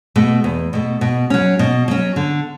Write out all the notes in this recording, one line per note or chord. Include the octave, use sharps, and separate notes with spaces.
B2 A3
E2
B2 A3
B2
F#3 C#4
B2
F#3 C#4
D3